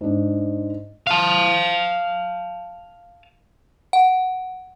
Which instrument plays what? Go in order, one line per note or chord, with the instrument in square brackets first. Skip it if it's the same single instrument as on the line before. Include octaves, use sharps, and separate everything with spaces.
[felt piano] G#2 D4
[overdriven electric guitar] F5 A5
[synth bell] F#5